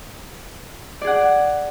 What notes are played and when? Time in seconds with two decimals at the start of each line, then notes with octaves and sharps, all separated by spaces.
1.02 D5
1.04 G#4
1.07 F#5